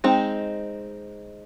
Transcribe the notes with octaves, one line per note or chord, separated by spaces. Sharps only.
G#3 C4 D#4